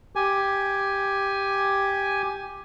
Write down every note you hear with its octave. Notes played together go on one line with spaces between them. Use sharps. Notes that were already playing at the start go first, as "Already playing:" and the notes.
G4 G#5